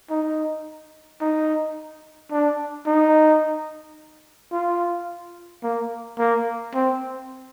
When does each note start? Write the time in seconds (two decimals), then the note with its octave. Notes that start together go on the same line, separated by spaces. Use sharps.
0.10 D#4
1.21 D#4
2.32 D4
2.87 D#4
4.52 F4
5.63 A#3
6.18 A#3
6.74 C4